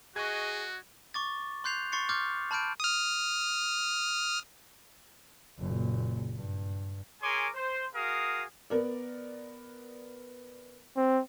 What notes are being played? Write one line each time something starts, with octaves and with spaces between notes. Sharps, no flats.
F#4 G#4 D#5 C#6 F#6 G#6
C#6 D6 A6
C6 F#6 G6 C7 F7
C6 C#6 A6 C7 C#7
C#6 D6 F6 G6 A6
A5 B5 F6 G6 D7
D#6 F6
F#1 A#2
G2
G#4 A#4 C#5 G#5 C6 D6
C5
F#4 G#4 A#4 F5 D#6
B3 A#4 D5
C4